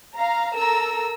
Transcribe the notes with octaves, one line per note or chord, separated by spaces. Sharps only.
F5 A#5
A4 A#4 A#5 E6